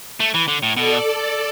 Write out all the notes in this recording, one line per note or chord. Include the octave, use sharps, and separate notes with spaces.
A3
E3
D3
A2
B2 A4 D5